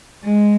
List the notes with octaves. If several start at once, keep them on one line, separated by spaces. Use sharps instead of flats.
G#3